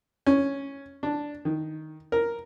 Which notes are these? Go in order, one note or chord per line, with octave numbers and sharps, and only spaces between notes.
C#4
D4
D#3
A#4